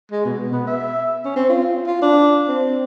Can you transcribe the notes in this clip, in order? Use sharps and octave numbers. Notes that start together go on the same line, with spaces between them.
G#3
B2
B3
E5
C#4
C4
F4
F4
D4
C4